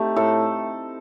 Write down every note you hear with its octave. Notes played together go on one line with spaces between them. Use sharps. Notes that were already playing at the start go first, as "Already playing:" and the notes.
Already playing: A3 C4 D#4 G4
A2 A4